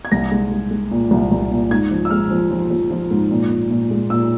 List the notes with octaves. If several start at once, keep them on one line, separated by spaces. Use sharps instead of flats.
G#6
C2 A#6
G#3
G#3
G#3
A#2
C2
C2
A#2
G#2 G#6
F3
E6
G#3 F6
F3
F3
F3
F3
G#2
A#2
A#2
A#2
G#3
A#2 E6